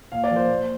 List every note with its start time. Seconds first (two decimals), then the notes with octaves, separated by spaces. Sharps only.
0.12 A#2 F5
0.24 D5
0.30 F3 A#3
0.36 C5
0.49 A#2